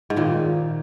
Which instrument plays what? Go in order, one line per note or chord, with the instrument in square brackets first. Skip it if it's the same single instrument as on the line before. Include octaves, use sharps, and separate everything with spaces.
[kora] G#2
[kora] A#2 [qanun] D#3